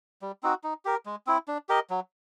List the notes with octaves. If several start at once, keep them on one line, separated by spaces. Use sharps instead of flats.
G3
C4 D#4 F#4
D#4
G4 A#4
G#3
C4 E4
D4
G4 A#4 D#5
F#3